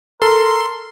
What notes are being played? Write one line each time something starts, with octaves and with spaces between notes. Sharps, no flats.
A4 A#4 C6